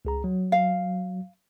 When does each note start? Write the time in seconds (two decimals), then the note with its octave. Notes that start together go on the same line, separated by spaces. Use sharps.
0.05 C#2 G#4 A#5
0.24 F#3
0.52 F5